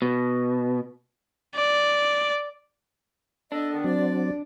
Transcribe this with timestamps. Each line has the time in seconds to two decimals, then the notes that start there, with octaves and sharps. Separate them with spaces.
0.02 B2
1.56 D5
3.52 B3 D4 A4 D#5
3.72 D#3 B3 A4
3.84 F#3 C4 D5